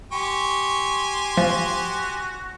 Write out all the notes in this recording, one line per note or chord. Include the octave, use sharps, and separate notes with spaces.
G4 G#5 C6 C#6
F3 F#4